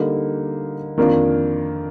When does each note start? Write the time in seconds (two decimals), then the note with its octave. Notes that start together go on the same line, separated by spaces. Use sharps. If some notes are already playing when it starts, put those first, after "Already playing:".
Already playing: D3 G3 A#3 D#4
0.98 F2 D#3 A#3 D4 F4